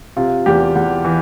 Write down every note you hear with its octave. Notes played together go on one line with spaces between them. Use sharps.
C3 F4
E2 G4
E2
E3